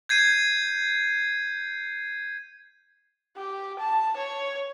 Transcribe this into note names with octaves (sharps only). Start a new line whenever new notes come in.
G6 G#6 C7 D#7
G4
A5
C#5